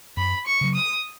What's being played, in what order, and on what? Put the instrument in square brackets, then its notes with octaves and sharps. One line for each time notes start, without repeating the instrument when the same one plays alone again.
[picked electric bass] F#2 [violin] B5
[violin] C#6
[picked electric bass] C#3 F#3
[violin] D#6